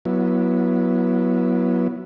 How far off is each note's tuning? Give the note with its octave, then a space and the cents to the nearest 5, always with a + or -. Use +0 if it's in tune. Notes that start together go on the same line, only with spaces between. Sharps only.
F#3 +0 B3 -20 E4 +10